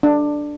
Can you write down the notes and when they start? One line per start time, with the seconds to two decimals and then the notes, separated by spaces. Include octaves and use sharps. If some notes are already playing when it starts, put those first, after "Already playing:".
0.03 D4